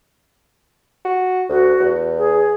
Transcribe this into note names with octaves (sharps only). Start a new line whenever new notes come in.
F#4
D2 F#4
E2
G#4